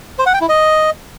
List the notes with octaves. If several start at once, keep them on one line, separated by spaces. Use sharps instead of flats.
C5
F#5
G5
E4
D#5